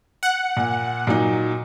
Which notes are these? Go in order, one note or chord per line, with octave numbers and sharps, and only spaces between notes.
F#5
A#2
A#2 F#3 D#4